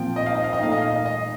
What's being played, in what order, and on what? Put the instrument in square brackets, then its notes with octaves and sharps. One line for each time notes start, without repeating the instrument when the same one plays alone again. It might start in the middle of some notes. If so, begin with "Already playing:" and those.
Already playing: [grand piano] A#2 F3 C4 [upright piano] G5
[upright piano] D#5
F5
D#5
F5
D#5
[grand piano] A#2 A3 D#4 [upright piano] F5
[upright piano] D#5
F5
D#5
D#5